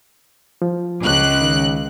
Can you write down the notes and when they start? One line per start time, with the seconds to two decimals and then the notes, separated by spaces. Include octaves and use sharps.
0.62 F3
1.02 C#2 F#6
1.42 D#3